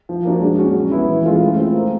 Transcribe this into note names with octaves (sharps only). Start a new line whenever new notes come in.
F3
A#3 D4 F#4 A#4
G#3
C#4 F#4
F#3
B3 E4
E3
G#3 C#4 F4 A4
A3
C4 F4
A#3